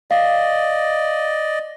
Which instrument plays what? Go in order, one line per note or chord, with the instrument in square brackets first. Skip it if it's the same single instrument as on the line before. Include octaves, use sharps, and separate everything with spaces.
[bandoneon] D5 D#5 [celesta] F5